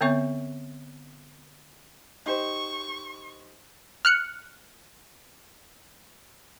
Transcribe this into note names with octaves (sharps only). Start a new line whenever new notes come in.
D3 B3 C4 C#5 E5 C#6
D#4 G4 C5 C#6
F6 F#6 C#7